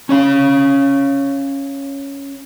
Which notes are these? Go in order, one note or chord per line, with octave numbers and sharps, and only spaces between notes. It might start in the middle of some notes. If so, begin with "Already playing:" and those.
C#4 C#5 F5